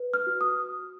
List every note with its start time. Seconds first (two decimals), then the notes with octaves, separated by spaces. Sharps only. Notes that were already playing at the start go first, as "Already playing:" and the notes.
Already playing: B4
0.14 F6
0.27 F#4
0.41 D#6